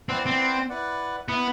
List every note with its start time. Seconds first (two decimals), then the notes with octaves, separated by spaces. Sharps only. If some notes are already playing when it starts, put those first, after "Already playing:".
0.09 C4 E4 B4 D5 F#5
0.26 C4
0.69 E4 B4 D5 F#5
1.28 B3 E4 B4 F#5